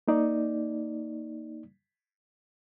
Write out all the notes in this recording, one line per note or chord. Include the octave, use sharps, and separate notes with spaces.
A#3 D#4 D5